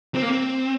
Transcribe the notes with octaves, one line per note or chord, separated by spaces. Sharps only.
C4
A#3
C4